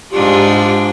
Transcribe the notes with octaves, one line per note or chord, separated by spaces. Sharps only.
G#2 D4 F4 G4